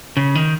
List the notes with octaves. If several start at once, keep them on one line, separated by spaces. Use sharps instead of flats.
C#3
D#3